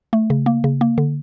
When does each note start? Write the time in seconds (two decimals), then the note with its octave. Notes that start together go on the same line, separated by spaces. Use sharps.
0.13 A3
0.30 C#3
0.46 A#3
0.64 C#3
0.81 A#3
0.98 D3